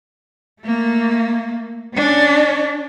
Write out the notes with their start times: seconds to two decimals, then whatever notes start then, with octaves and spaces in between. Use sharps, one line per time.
0.62 A3 A#3
1.95 C#4 D4